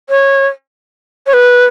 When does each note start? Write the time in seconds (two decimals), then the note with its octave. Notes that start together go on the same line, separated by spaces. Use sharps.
0.10 C#5
1.26 C#5
1.33 B4